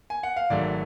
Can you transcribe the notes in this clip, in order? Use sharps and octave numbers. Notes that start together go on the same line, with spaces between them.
G#5
F#5
F5
G#1 G#2 F#3 A3 D5